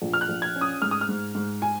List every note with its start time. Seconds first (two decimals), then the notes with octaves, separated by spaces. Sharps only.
0.02 A#1
0.13 F6
0.21 F#6
0.29 A#1
0.42 G#6
0.56 C#4
0.61 D#6
0.82 G#2 F6
0.91 D#6
1.01 F6
1.09 G#2
1.35 G#2
1.62 G#5